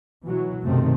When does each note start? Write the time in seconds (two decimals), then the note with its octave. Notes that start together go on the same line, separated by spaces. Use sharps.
0.24 B2 E3 F#3
0.62 B1 F#2 C3 D#3 A3 C4